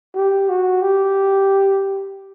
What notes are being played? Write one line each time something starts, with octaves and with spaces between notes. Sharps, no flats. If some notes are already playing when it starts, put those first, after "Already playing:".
G4
F#4
G4